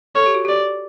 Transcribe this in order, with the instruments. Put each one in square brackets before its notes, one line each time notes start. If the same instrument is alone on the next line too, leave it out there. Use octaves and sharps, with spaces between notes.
[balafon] A4 [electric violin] C#5
[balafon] G4
F#4
[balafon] G4 [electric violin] D5